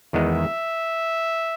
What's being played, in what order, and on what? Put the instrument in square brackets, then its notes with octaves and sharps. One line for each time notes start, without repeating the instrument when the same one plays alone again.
[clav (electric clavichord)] E2 D#3 G#3 B3 D#4 [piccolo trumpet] E5